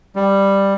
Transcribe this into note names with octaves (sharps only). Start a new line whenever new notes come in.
G3